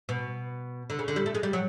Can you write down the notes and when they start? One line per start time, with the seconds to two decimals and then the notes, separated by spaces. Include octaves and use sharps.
0.09 B2
0.90 D3
0.99 C#3
1.08 D3
1.16 G3
1.26 A3
1.35 G#3
1.43 G3
1.53 F#3